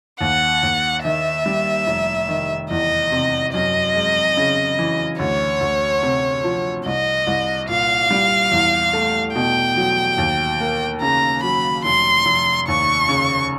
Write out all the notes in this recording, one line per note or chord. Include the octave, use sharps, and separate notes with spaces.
D#2 F#5
D#2
D#3 E5
G3
F1
D#3
E2 D#5
C3
F#2 D#5
G#3
C#3
E3
D2 C#5
D2
C3
F3
C2 D#5
C2
A#2 F5
G3
E2
A3
B2 G5
F#3
D#2
A#3
C#3 A#5
F#3 B5
F1 C6
F1
D#2 C#6
C#3